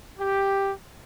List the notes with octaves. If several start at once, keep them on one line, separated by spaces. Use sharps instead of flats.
G4